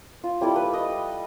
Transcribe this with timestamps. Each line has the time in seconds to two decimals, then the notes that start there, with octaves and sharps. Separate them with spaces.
0.24 F4
0.41 G3 E4 A4 D5
0.56 B4
0.73 D#5